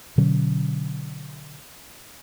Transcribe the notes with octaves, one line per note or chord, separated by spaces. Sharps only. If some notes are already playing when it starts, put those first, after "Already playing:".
B2 D3 F#3 C#4